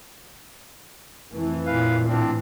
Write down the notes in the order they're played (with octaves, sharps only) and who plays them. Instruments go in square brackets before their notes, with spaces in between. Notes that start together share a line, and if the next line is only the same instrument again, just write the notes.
[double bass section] F2 E3 A3
[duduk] A#2 [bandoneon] B4 F5
[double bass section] A2 E3 [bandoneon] F3 C4 D4